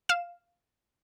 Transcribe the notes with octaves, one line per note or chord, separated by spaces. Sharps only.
F5 E7